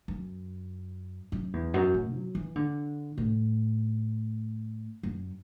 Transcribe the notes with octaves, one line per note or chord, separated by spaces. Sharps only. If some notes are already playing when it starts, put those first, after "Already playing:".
F#2
F#2
E2
F#2
A2
F#3
E3
D3
A2
F#2